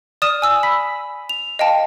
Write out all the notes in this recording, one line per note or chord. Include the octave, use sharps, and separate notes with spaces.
D5 D#6 F6 D#7 E7
G#5 E6
B5 E6 B6
F7
D#5 F5 G5 A5